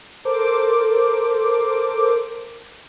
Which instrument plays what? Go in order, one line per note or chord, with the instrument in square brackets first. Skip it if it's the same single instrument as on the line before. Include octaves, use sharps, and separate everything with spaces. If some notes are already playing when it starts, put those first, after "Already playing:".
[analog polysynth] A4 A#4 C5 D6